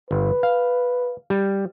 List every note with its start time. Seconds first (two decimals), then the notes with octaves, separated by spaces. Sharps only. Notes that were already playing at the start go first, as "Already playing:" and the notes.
0.11 G1 B4
0.43 F5
1.30 G3